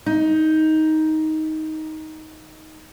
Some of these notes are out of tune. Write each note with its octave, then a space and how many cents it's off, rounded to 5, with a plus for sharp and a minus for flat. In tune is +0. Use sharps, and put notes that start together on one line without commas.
D#4 +10